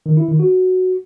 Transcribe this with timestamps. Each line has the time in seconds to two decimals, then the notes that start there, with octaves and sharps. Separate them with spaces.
0.06 D#3
0.17 E4
0.28 D#3
0.40 F#4